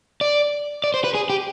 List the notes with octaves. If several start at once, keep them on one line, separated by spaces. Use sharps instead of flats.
D5
D5
C5
B4
G#4
G4